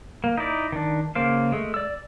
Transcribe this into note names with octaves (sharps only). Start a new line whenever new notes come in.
A#3
D#4 E4 D5
D#3 D4
C#3 A#3 C5 F5
G#3 A3
D5 E6